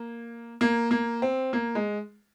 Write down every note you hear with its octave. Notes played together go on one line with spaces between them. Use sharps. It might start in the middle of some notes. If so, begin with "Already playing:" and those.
Already playing: A#3
A#3
A#3
C4
A#3
G#3